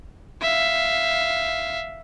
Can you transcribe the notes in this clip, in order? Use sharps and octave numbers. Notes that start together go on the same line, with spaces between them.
E5 F5